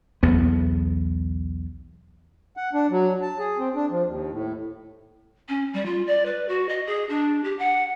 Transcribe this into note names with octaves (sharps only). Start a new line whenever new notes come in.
B1 E2 B3
F#5
D4
F#3
A5
G#4
C4
D4
F3
D#2
A2
C#4
G3
F4
D5
B4
F#4
D#5
G#4
D4
G4
F#5